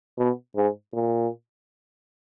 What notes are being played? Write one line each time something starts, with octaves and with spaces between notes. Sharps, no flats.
B2
G#2
A#2